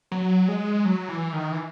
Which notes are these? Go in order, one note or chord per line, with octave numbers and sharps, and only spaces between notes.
F#3
G#3
F#3
E3
D#3
E3